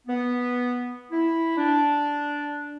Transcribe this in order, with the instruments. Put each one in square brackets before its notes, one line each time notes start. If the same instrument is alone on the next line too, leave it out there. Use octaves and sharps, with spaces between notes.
[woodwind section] B3
E4
D4